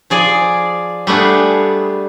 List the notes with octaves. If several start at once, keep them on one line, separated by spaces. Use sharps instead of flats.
F3 G#4 D5
G3 A3 B3 D4 G#4